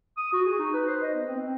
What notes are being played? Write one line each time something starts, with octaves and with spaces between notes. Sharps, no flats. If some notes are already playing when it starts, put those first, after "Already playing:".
D#6
F#4
G#4
D#4
B4
C5
D#5
B3
C4
C4